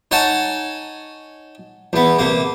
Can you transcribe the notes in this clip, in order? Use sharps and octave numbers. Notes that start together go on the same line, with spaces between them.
D#4 C#5 F#5 G#5 A5
E2 B3
C3 A#3